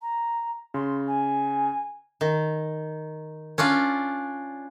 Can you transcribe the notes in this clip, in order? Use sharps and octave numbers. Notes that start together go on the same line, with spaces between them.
A#5
C#3 C6
G#5
D#3
C#4 D4 F4 D5